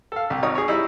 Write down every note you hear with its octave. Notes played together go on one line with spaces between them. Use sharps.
A4 F5
C2
G#1 D#4 C#5 D#6
G#4 C#5
G3 D#4 E4